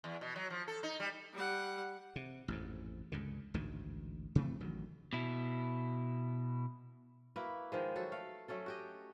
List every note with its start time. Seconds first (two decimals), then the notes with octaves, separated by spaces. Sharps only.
0.04 E2
0.21 B2
0.36 F#3
0.50 F3
0.68 A4
0.83 D#4
1.00 G3
1.33 G3 F#5
2.16 C3
2.48 A1 F2 G#2
3.12 C#2 G2 D3
3.54 A1 D2 G#2 D#3
4.35 C3 E3 A3 C4
4.60 A1 D#3 F#3
5.13 B2 E4
7.36 A#3 E4 F#4 B4
7.72 D#3 F3 G#3
7.96 F#3 F#4 A4
8.12 A3 F5
8.48 F#3 A3 C#4 A4
8.66 F#4 G4 D#5